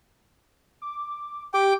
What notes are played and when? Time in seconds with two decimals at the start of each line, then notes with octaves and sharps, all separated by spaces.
0.82 D6
1.54 G4 G5 D6